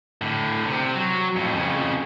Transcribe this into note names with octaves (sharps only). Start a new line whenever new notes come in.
A2 D3
C3
F#3
F2 A2
F2 C#3